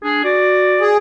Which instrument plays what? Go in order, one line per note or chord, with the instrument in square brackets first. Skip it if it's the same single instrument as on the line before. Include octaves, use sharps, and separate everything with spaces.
[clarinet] D4 [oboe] G#4
[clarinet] F#4 [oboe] D5
[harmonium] G#4